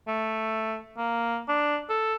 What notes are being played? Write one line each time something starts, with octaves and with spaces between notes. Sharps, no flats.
A3
A#3
D4
A4